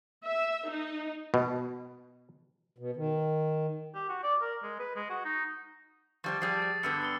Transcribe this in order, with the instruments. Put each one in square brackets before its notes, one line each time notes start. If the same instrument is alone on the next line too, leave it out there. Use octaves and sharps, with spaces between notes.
[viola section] E5
D#4
[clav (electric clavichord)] B2
[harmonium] B2
D#3
[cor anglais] G4
F#4
D5
A#4
G#3
B4
G#3
F#4
D#4
[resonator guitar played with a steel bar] F3 G3 C5 [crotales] C#6 A6
[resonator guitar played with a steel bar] F3 G3 G#4 [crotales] D#6 A6 C7
[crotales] A6
[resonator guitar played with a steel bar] G2 D3 B3 [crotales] E6 F6 C#7
[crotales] E6 C#7 G7